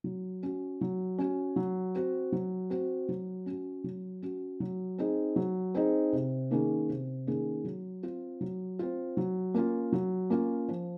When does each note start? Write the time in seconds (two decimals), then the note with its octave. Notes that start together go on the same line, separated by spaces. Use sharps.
0.04 F#3
0.43 C#4 F#4
0.81 F#3
1.18 C#4 F#4
1.56 F#3
1.95 C4 F#4
2.32 F#3
2.70 C4 F#4
3.09 F#3
3.46 C#4 F#4
3.84 F#3
4.22 C#4 F#4
4.60 F#3
4.98 C4 D#4 G#4
5.36 F#3
5.74 C4 D#4 G#4
6.13 C3
6.51 D#3 A#3 C#4 G#4
6.89 C3
7.27 D#3 A#3 C#4 G#4
7.64 F#3
8.03 C4 F4
8.41 F#3
8.79 C4 F4
9.17 F#3
9.54 A#3 C#4 F4
9.92 F#3
10.30 A#3 C#4 F4
10.68 F3